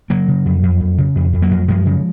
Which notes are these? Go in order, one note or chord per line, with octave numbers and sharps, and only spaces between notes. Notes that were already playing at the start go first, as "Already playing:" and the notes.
C#3 F#3 A#3
C#3
F2
F2
F2
C#3
F2
F2
F#3 A#3
F2
F#2 F3 G#3
C#3